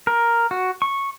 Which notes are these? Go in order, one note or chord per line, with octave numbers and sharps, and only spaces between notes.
A#4
F#4
C#6